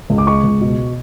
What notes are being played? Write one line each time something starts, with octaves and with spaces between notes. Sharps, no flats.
C#2
D6
G#3 C#6
C#2
B2